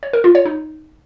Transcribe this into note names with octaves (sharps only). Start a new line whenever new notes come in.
C#5
A#4
F4
C#5
D#4